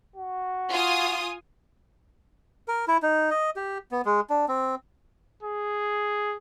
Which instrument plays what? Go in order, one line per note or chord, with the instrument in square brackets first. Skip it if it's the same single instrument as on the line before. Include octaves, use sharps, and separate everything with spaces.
[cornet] F#4
[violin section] F4 G#5 D#6
[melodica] A#4
E4
D#4
D#5
G4
B3
G#3
D4
C4
[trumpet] G#4